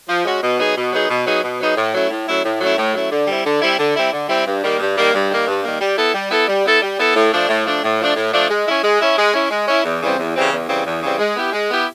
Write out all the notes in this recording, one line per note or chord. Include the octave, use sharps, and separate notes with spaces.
F3
G#3 C#4 F#4
B2
F#3 B3 D#4 G#4
B2
F#3 B3 D#4 G#4
B2
F#3 B3 D#4 G#4
B2
F#3 B3 D#4 G#4
A2
F#3 A3 C#4 E4
A2
F#3 A3 C#4 E4
A2
F#3 A3 C#4 E4
A2
F#3 A3 C#4 E4
D3
G3 C4 E4
D3
G3 C4 E4
D3
G3 C4 E4
D3
G3 C4 E4
G2
D#3 G3 A#3
G2
D#3 G3 A#3
G2
D#3 G3 A#3
G2
D#3 G3 A#3
G3
B3 E4 A4
G3
B3 E4 A4
G3
B3 E4 A4
G3
B3 E4 A4
A2
F3 A3 D4
A2
F3 A3 D4
A2
F3 A3 D4
A2
F3 A3 D4
G#3
C#4 E4
G#3
C#4 E4
G#3
C#4 E4
G#3
C#4 E4
E2
C#3 E3 G3 C4
E2
C#3 E3 G3 C4
E2
C#3 E3 G3 C4
E2
C#3 E3 G3 C4
G#3
B3 E4 G4
G#3
B3 E4 G4